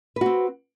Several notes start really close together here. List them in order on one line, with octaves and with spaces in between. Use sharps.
B4 F#4 C4